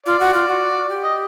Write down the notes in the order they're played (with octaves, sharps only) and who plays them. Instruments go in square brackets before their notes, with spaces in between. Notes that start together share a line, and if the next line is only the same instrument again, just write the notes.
[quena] F4 [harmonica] D5
[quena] F#4
F4
F#4
G4
[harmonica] D#5